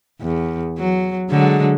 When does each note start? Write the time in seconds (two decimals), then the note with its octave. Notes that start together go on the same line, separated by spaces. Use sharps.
0.21 E2
0.78 F#3
1.30 D3 F#3 G#3